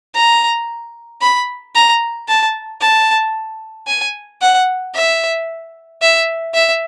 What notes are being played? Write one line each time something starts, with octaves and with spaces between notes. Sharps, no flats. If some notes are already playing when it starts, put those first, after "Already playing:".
A#5
B5
A#5
A5
A5
G#5
F#5
E5
E5
E5